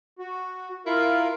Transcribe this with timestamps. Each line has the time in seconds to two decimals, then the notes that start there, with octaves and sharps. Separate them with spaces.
0.19 F#4
0.86 E4 F4 A#4 F5